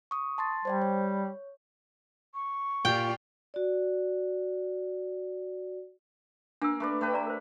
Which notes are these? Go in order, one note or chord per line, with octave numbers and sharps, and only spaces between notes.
C#6 D#6
A5 C6 A6
G3 C5 D5 G5
C#5
C#6
A#2 F4 G4 D5 G5
F#4 D5
A#3 D4 E6
A3 B4 D5
A3 G4 B4
D5 A#5
A#4 C5